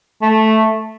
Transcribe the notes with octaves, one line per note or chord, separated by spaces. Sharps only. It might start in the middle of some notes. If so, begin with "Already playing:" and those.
A3